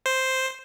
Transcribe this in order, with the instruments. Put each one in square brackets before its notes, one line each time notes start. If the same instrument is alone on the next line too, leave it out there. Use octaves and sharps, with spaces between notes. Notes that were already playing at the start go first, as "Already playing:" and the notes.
[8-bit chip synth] C5